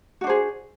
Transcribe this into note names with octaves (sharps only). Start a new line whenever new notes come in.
D4 F#4 G#4 C5